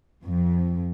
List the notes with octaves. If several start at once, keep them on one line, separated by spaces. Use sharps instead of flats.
F2